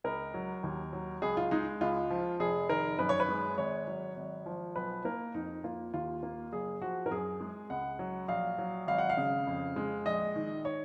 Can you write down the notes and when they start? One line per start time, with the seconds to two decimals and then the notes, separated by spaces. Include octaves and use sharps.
0.04 C#2 A#4
0.34 F#3
0.63 D#2
0.93 F#3
1.22 C#2 G#4
1.37 F4
1.51 G#3 D#4
1.81 C#2 F4
2.10 F3
2.39 F1 G#4
2.69 D#3 A#4
2.99 F#2 B4
3.09 C#5
3.20 B4
3.28 G#3
3.58 G#1 C#5
3.87 F#3
4.17 G#1
4.46 F3
4.76 B1 B4
5.05 A#3 A#4
5.34 F2 D#4
5.64 A#3 F4
5.94 D#2 F4
6.23 A#3
6.52 F#1 G#4
6.81 F3 F#4
7.06 A#4
7.11 F#2 G#4
7.41 G#3
7.70 C#2 F#5
7.99 F#3
8.28 A#1 F5
8.58 F#3
8.87 G#1 F5
8.98 F#5
9.10 F5
9.17 C#3
9.47 F2
9.76 G#3
10.06 A#1 D#5
10.36 D#3
10.65 C#5